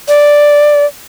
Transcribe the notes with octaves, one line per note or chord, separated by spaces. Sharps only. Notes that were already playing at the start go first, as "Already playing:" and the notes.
D5